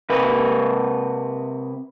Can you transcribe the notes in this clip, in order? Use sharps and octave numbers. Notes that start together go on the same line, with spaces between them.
C3 A#4 B4